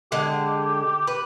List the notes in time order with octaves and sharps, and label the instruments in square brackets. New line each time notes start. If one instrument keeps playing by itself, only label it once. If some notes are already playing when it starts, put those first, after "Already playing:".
[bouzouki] D3 G#3 [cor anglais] G4
[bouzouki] B4